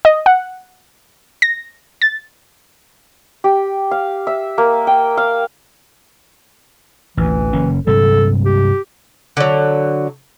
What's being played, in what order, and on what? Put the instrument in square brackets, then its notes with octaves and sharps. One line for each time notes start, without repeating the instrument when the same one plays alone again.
[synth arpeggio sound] D#5
F#5
A#6
A6
[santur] G4
F5
E5
A#3
G5
F5
[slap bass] A1 D2 [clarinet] E3
[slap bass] F#1 A#3 C#4
[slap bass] G2 C3 F#3 [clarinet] A4
[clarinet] G4
[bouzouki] D3 F#3